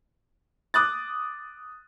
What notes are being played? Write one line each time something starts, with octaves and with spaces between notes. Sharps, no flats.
D6 D#6 F#6 A6